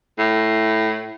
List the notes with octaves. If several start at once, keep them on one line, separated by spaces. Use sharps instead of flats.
A2